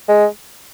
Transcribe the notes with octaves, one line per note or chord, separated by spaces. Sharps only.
G#3